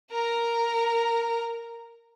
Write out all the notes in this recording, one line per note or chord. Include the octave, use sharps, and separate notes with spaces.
A#4 A#5